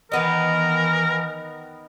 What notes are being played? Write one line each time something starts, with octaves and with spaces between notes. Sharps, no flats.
D#3 E3 B3 D#4 A#4